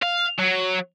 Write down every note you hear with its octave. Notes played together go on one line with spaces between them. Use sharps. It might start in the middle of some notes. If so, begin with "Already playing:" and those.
F5
F#3